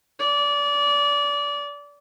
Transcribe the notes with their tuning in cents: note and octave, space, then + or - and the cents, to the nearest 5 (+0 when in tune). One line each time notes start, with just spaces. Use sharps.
D5 -25